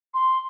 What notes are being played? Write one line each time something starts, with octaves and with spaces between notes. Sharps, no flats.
C6